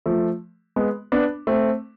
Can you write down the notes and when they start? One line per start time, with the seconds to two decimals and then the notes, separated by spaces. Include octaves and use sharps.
0.06 F3 A3
0.76 G#3 B3
1.12 B3 D4
1.47 A3 C4